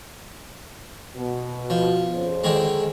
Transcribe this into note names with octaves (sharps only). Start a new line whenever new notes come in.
B2
F3
F2 C#3 C5
D3 D#3 G#3